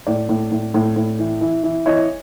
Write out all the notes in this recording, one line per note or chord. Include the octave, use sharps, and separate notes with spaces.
A2 D5
A2
A2
A2
A2
E3
E3
E3
E3 C#5 D#5